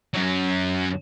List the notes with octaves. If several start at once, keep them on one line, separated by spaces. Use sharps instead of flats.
F#2 F#3